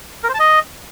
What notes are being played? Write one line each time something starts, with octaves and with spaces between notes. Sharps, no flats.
A#4
C5
A5
D#5